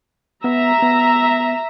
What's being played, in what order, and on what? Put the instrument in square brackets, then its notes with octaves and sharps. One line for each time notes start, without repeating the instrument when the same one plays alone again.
[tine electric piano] B3 [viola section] E5 A#5
[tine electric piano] B3